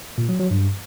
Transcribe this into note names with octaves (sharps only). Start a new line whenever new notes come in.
A#2
F#3
F#3
G2